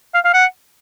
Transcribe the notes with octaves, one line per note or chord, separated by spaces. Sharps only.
F5
F5
F#5